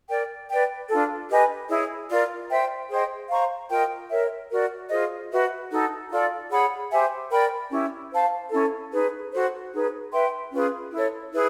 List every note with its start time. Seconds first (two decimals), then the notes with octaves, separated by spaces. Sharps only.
0.08 A#4 D5 G5
0.49 B4 D5 G5
0.89 D4 F4 A4
1.29 G4 B4 D#5 G#5
1.69 E4 G#4 C#5
2.09 F4 A#4 D5
2.49 C5 E5 G5
2.89 G#4 C5 D#5 G5
3.30 C5 F5 A#5 C#6
3.69 F4 A#4 D#5 G5
4.10 A#4 C#5 E5
4.50 F#4 A#4 D5
4.90 F4 G#4 C5 D#5
5.30 F#4 B4 E5
5.71 D#4 F#4 A4
6.11 F4 A4 D5
6.51 G#4 C#5 F#5 B5
6.91 G4 C5 E5 G#5
7.31 A#4 D5 G5 B5
7.71 C#4 E4 G4
8.12 C5 F5 A5
8.51 C#4 E4 A4
8.92 D#4 G#4 B4
9.32 F#4 A4 C5
9.73 D#4 G#4 B4
10.12 B4 E5 G5 C6
10.52 C#4 F4 G#4 B4
10.93 E4 A4 C#5
11.33 E4 G#4 B4